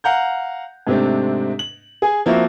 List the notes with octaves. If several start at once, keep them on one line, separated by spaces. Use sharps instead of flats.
F5 F#5 A#5 G6
G#2 C3 A3 C4 D4
F#7
G#4 G#5
F3 A#3 C4 E4 F#4